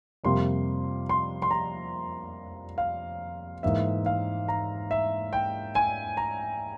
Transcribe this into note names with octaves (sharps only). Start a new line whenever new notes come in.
F2 C3 G3 A#3 C6
C6
C6
A#5
F5
G#2 E3 A#3 E5
F5
A#5
E5
G5
G#5
A#5